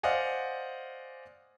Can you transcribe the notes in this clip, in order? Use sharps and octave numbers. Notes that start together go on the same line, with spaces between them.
C5 D5 D#5 F5 F#5 G#5